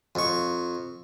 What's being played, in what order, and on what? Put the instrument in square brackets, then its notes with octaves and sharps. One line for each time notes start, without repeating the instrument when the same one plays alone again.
[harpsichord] F2 C#6